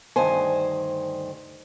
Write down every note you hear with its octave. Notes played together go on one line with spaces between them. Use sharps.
D2 G2 D#3 C5 G#5